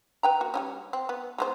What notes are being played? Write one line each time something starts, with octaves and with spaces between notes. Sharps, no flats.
B4 G5 A#5
A#3 F#4
G3 A3 C#4
C4
B3
G#3 B3 C5